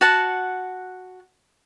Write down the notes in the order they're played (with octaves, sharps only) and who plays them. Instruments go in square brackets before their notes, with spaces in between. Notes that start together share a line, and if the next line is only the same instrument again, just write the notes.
[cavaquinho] F#4 F#5 A5